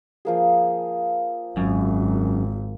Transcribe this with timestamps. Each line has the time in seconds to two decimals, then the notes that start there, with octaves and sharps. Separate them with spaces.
0.25 F3 A#3 G#4
1.57 G#1 F#2